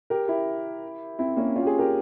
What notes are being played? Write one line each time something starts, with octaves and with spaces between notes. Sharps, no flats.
G4 A#4
E4 G4
C4 E4
A#3 C#4
C#4 F4
G4
F4 G#4
G4 A#4